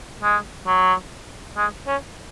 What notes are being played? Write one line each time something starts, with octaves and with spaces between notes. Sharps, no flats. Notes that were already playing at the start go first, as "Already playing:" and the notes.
G#3
F#3
G#3
C#4